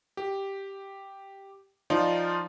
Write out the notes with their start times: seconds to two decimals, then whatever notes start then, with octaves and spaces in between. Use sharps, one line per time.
0.17 G4
1.90 F3 D#4 F4 D5